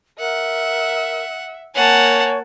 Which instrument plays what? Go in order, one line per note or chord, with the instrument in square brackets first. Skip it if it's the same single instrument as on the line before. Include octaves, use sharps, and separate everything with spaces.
[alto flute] A#4 [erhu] E5 [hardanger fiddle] F#5
[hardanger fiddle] A#3 [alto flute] C#5 [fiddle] F#5 A5 [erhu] G#5